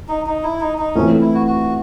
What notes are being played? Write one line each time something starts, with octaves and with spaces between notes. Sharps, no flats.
D#4
D#4
E4
D#4
D#4
E3 A3 C4 C#4
E4
F#4
F#4